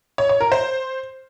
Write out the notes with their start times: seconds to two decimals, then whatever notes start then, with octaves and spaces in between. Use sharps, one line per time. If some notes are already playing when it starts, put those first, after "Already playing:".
0.18 C#5
0.29 C#5
0.41 A#4
0.52 C5